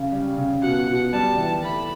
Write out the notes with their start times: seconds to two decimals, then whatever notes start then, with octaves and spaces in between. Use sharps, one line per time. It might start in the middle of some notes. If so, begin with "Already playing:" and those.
Already playing: C#3
0.12 G3
0.38 C#3
0.62 B2 F#5
0.88 B2
1.13 G3 A5
1.38 E3
1.63 A3 B5